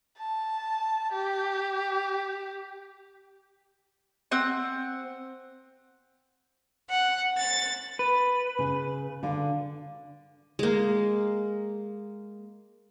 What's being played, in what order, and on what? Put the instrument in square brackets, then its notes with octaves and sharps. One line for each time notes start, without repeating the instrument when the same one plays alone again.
[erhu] A5
G4
[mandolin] C4 F#5
[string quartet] F#5
A6
[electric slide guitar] B4
[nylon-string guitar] C#3
D3 F5
[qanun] G#3 A#3